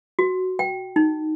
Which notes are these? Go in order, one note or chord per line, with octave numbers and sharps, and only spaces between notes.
F#4
G5
D#4